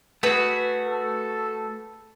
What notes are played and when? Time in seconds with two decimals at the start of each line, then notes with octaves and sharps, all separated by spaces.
0.23 A3 F#4 G#4 B4 E6
0.88 A4